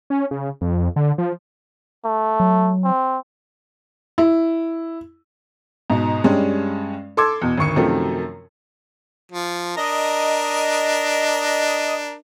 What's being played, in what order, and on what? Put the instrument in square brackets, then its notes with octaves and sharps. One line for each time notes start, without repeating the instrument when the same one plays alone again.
[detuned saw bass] C#4
C#3
F2
D3
F3
[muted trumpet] A3
[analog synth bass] F#3
[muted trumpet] C4
[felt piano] E4
[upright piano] G#2 B2
G2 G3 G#3 C#4
A4 C6 D6 E6 G#6
E2 B2
G#1 D2 C#6 C#7
F#2 C3 D#3 F3 F#3 A3
[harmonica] F3
[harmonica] D4 A#4 [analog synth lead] D#5